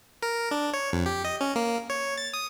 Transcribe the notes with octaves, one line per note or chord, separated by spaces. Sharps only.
A#4
D4
C#5
F2
G4
D#5
C#4
A#3
C#5
A6
D#6